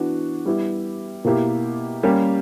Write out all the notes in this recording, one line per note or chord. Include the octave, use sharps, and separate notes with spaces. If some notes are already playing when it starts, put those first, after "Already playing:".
Already playing: E3 B3 D4 F#4
G3 B3 E4 G4
B2 A#3 E4 G4
G3 A#3 C#4 G4